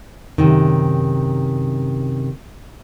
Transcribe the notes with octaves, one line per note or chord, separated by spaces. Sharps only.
F#2 C3 D#3